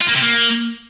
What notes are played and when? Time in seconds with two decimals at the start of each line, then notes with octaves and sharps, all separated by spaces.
0.01 F4
0.08 A#3
0.15 C3
0.22 A#3